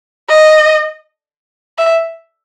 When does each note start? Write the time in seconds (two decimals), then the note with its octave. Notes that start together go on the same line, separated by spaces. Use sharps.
0.29 D#5
1.78 E5